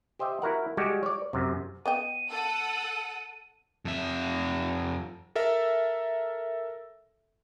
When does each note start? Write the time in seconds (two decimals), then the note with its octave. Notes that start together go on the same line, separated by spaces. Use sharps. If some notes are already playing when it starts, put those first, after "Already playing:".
0.19 G4 C5 D#5 E5 G5
0.42 E4 F#4 A#4 F#5
0.77 G3 G#3 F#4 G4
1.03 C#5 D5
1.33 F#2 C3
1.86 B3 D#5 G5 D#7
2.30 A4 F#5
3.85 F2 E5
5.35 A4 A#4 E5